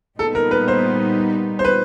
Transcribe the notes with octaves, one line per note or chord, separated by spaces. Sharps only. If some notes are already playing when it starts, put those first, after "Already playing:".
A#2 G3 B3 D#4 A4
A#4
B4
C5
C5
B4